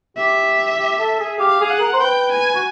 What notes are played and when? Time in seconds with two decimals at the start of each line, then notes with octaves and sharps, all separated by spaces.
0.17 G4 E5
0.79 G4
0.99 A4
1.20 G#4
1.40 G4 F5
1.61 G#4
1.70 F#5
1.80 A#4
1.93 C5
2.01 B4 G5
2.32 G#5
2.55 F#4